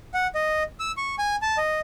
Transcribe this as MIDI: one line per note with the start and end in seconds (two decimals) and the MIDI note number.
0.14 0.27 78
0.35 0.63 75
0.80 0.92 88
0.97 1.15 85
1.19 1.36 80
1.42 1.57 81
1.57 1.80 75